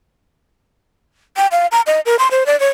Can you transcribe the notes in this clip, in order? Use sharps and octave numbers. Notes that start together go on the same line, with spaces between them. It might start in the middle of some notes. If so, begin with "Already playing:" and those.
G5
F5
A#5
D#5
A#4
C6
C5
D5
C#5